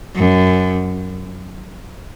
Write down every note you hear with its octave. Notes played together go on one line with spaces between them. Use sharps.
F#2